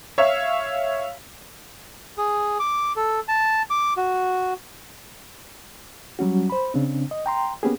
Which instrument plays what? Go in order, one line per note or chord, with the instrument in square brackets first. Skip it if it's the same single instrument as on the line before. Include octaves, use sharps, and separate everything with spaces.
[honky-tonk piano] C#5 E5 F5
[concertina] G#4
D6
A4
A5
D6
F#4
[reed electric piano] F#3 G3 C#4 F#4
C5 B5
C#3 C4 D4
D#5
G5 A#5 C6
A#3 B3 C#4 G4 G#4